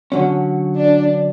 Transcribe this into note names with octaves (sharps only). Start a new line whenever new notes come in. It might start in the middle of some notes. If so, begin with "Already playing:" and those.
D3 F#3 C#4
D4